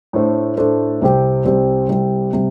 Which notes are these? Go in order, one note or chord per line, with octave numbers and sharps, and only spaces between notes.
A2 A3 D4 A4 C5
A2 A3 D4 A4 C5
C2 C3 G3 C4 G4
C2 C3 G3 C4 G4
C2 C3 G3 C4 G4
C3 G3 C4 G4